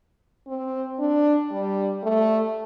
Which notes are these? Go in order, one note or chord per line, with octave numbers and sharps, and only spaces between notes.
C4
D4
G3
A3